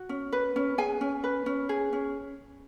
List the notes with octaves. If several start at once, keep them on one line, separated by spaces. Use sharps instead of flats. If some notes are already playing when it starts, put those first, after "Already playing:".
Already playing: F#4
C#4
B4
C#4
G#4 G#5
C#4
B4
C#4
G#4
C#4